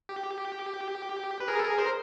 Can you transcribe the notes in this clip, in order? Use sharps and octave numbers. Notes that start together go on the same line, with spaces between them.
G4
B4
G#4 A#4
A4
G#4 A#4
A#4 C5